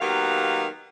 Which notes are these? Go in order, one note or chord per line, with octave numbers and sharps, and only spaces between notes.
D#3 F#3 A#3 B3 G4 F5